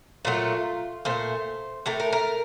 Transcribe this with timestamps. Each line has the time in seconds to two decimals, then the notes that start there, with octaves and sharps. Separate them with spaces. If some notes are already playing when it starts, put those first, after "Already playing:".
0.25 A#2 F#3 A3 F4
1.05 A#2 A3 C5
1.86 A2 A3 A#4
2.00 A#4
2.13 A#4